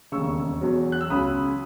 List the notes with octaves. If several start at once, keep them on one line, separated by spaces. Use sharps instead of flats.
E1 D#2 C#3 C#6 E6
E2 B2 F#3
F#6
E6
C#2 C#3 F#3 B5 D#6